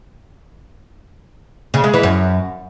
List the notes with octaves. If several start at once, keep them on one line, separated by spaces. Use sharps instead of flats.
C#3
G#3
E3
F#2